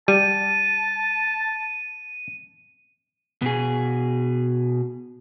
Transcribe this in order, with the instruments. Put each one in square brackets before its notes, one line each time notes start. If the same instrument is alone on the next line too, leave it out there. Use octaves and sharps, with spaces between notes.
[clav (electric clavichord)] G3 [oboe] A5 [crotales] D#7
[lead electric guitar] B2 G#4